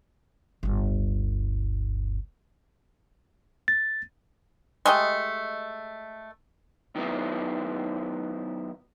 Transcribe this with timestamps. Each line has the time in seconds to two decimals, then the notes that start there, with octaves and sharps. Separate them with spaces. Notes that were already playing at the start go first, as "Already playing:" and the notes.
0.63 D1 G1
3.68 A6
4.86 G#3 A3 G4 D#5
6.96 D#3 F#3 B3 E4